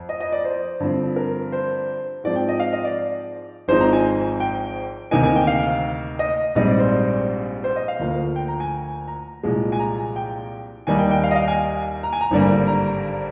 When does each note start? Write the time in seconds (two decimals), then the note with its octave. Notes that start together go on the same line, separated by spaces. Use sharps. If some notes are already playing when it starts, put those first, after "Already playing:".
Already playing: F2
0.09 D#5
0.21 D#5
0.32 D5
0.45 C5
0.80 G2 D3 F3 C4
1.16 A#4
1.52 C5
2.24 G#2 F3 C4 D5
2.36 G5
2.49 D#5
2.60 F5
2.73 D#5
2.85 D5
3.68 G#1 G#2 F3 C4 D#4 C5
3.80 A#5
3.93 G#5
4.40 G5
5.11 D2 C3 D#3 A#3 D#4 G#5
5.23 G#5
5.36 G5
5.47 F5
6.19 D#5
6.55 A#1 G#2 G3 C4 D#5
6.68 D5
6.79 C5
7.64 C5
7.76 D#5
7.88 F5
7.99 D2 D3 F3 A#3
8.36 G5
8.48 A#5
8.60 G#5
9.08 A#5
9.43 C2 A#2 F3 G#3
9.72 G#5
9.79 A#5
10.16 G5
10.87 D#2 D#3 G3 A#3 D#4 G#5
10.99 G5
11.11 G5
11.24 F5
11.31 D#5
11.35 F5
11.48 G#5
12.03 A#5
12.13 G#5
12.21 A#5
12.31 G#1 G2 D3 G3 A#3
12.67 A#5